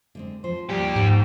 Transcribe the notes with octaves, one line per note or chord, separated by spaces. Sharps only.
D3 G#3 C4
F3 C5
D#2 G3 G4
G#2